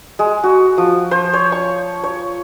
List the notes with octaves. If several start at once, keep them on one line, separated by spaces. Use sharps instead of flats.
G#3
F#4
F3
C5
C#5
C#6
C#5